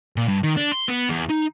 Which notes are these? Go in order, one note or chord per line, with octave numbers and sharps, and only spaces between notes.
A#2
G2
D#3
D4
C6
B3
E2
D#4